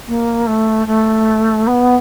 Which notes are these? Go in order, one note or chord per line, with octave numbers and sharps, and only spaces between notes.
A#3
A3
A3
B3